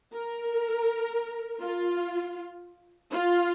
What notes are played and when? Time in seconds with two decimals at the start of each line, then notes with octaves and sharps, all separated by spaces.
0.14 A#4
1.62 F4
3.11 F4